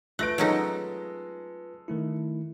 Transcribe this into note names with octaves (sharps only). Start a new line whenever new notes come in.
A3 F4 B4 F#6 A#6 D7
F#3 G#3 C#4 D#4 A4
D#3 A3 E4